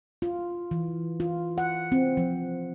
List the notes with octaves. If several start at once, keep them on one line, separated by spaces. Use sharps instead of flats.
F4
E3
F4
F#5
C4
F3